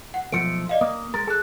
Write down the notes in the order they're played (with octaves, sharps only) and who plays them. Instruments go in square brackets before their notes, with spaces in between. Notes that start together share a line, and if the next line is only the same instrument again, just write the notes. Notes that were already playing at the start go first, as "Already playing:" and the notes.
[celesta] F#5
[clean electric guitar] B1 F3 A3 [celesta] C#7 D7
[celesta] D5 D#5 F5
[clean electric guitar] A#3 [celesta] D#6
[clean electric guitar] G#3 A#4 [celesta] A6
[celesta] G#4 F#6 [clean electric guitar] A4 A5